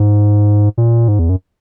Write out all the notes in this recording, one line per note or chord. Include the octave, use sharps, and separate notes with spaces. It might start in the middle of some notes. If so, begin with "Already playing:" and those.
Already playing: G#2
A#2
G#2
E2
F#2